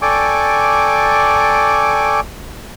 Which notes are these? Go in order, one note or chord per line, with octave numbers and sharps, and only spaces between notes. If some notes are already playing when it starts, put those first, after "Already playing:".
A4 D5 G5 G#5 C#6 D6